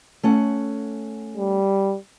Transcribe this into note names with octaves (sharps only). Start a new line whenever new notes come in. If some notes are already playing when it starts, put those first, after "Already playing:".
A3 C#4 F#5
G3